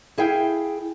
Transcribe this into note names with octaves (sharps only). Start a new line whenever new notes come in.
E4 G#4 F5 G5